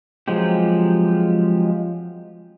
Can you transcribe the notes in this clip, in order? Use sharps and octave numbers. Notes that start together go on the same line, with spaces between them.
F3 F#3 G#3 C4 G4